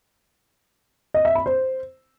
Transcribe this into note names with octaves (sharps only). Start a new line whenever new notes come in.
D#5
E5
B5
C5